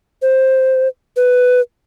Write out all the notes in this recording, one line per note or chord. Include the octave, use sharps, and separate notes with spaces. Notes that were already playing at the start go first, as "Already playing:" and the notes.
C5
B4